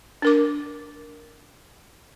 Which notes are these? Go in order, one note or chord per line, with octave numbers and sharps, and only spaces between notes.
D4 A#4 D6